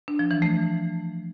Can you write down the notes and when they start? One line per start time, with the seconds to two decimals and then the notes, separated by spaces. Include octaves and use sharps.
0.08 D4
0.19 F3
0.31 E3
0.42 A3